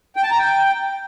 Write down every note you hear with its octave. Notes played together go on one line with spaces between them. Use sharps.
G5
A5
A#5
G5